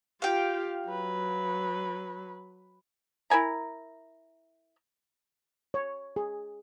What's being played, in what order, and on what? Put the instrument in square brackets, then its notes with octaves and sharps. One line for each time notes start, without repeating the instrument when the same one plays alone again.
[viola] F4 G4 [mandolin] F5 G5
[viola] F#3 [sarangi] B4
[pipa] E4 A#4 G#5 A#5
[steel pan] C#5
G#4